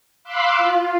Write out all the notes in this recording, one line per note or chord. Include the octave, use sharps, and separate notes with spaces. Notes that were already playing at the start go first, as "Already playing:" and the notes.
F5 B5 C6 D6 E6 F#6
F4